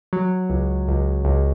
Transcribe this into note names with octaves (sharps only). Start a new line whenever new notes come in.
F#3
C#2
C#2
C#2